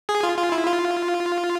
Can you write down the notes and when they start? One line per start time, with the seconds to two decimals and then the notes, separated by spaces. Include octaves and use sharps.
0.09 G#4
0.23 F4
0.38 F4
0.52 E4
0.67 F4